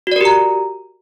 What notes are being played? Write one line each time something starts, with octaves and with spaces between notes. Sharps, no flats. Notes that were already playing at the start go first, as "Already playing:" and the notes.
F#4 G4 A#4 D5 A#5